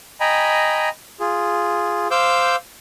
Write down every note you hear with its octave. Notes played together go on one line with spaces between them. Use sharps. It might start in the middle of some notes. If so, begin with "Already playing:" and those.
D#5 G5 G#5 A#5 B5
F4 G#4
C5 F5 D6 E6 G6